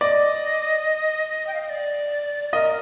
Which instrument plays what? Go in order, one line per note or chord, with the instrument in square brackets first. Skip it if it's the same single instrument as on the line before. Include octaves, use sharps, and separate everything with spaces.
[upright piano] D5 [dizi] D#5
[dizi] G5
F5
D#5
D5
[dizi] A#4 [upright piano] D#5